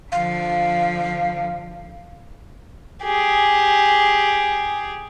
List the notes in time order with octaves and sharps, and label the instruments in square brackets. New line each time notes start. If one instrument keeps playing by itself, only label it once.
[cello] D3 F3 [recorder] F5
[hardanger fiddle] G4 G#4